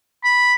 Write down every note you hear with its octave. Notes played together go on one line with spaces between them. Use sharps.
B5